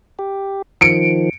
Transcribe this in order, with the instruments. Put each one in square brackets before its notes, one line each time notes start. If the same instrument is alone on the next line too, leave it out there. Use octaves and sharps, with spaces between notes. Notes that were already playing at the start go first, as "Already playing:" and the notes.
[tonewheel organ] G4
[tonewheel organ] D#3 F3 [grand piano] C#7 D7